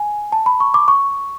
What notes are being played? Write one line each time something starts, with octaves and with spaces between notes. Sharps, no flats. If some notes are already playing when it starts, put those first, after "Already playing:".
Already playing: G#5
A5
B5
C#6
D6
C#6